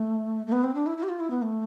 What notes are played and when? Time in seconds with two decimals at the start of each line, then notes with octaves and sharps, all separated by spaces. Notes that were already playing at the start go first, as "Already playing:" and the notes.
Already playing: A3
0.46 A3
0.52 B3
0.63 C4
0.74 D4
0.86 E4
0.97 E4
1.03 G4
1.08 F4
1.19 E4
1.30 B3
1.42 A3